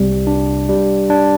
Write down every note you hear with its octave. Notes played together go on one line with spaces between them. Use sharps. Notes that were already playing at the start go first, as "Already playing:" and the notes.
Already playing: C2 C3 G3
D4
G3
D4